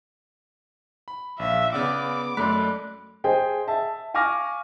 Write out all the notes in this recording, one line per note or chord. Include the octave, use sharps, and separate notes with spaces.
B5
A#1 E5 F5
C#3 B3 D5 F#5 D6
F#2 A3 A4 D5 B5 F#6 B6
G#4 C5 D#5 G5
E5 A5
F5 G#5 C#6 D6 F6 A#6